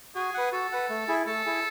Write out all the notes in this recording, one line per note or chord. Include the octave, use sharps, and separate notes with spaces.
F#4 G#4
B4 F#5
F#4 A4
B4 F#5
A3
E4 G#4
A3 A4
E4 G#4